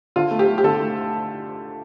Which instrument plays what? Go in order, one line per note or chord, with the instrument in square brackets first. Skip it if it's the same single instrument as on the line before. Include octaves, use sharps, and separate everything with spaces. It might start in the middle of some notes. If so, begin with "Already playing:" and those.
[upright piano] D3 F4
A3
G4
A3
G4
D3 A4
A3